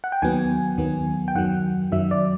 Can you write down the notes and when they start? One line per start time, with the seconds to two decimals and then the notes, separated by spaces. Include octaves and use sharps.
0.04 F#5
0.12 G5
0.22 D#2 D#3 F#3 B3 G#5
0.78 D#2 D#3 F#3 B3
1.28 G5
1.35 F#2 D#3 F#3 F#5
1.92 F#2 D#3 F#3 E5
2.11 D5